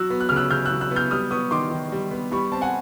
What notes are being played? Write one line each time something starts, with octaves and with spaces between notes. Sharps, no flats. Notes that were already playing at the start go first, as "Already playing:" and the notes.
Already playing: F#3 E6 F#6
B3
F#6
C#3 F6
E6 F#6
C#3 F6 G6
E6 F#6
F#3
E6 F#6
B3
F6 G6
G3 D#6 F6
B3 C#6 D#6
D#3 C6 D6
D#3
G3
B3
G3 B5 C#6
C4 A5
F#5 G#5